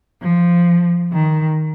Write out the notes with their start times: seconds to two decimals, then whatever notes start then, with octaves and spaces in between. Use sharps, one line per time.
0.21 F3
1.12 D#3